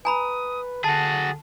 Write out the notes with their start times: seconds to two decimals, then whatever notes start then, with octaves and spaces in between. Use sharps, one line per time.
0.05 B4 G#5 A#5 B5 D#6
0.84 D3 F#4 G#4 A5 A6